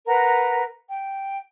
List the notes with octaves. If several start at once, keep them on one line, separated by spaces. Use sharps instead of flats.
A#4 B4 F#5 A#5
G5